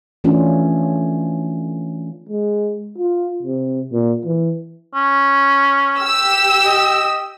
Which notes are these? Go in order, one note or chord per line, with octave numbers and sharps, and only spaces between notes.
E3 A3 C#4 D4 F4
G#3
F4
C3
A#2
E3
C#4
G4 E6
D#5